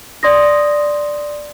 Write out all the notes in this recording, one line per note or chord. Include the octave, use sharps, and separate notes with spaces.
D5 C6 D#6 A#6